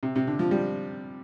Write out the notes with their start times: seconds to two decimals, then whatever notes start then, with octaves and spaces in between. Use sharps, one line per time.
0.03 C3
0.16 C3
0.27 D3
0.39 F3
0.51 G3